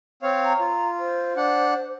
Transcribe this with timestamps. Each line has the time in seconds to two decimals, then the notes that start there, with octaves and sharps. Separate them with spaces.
0.23 C4 C#5 F5
0.45 A#5
0.60 F4
1.00 C5
1.37 D4 F#5